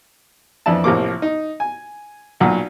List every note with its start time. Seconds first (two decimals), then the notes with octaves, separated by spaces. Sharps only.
0.66 F2 E3 D4 E4 A5
0.84 A1 C3 F3 A#3 D6
1.22 D#4
1.60 G#5
2.40 B1 A#2 F#4